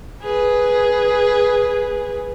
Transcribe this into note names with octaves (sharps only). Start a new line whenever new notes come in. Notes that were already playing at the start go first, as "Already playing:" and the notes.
G#4 B4